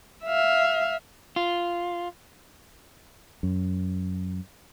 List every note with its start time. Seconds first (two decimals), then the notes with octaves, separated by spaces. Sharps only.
0.25 E5 F5
1.36 F4
3.43 F#2